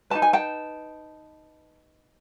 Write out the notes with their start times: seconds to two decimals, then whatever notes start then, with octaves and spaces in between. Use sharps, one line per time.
0.10 D#4 G4 B4 A5
0.22 G#5
0.33 G5 A5